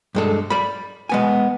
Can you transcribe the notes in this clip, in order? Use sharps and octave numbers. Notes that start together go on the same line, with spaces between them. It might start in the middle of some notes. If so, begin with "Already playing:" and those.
G2 G#3 A4
D5 B5
G#3 B3 G#5